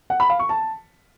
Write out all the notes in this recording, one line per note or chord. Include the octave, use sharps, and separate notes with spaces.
F#5
B5
F5
C#6
A5